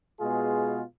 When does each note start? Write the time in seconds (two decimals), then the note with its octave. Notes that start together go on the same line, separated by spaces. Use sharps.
0.19 B2 G#3 B3 F4 G#4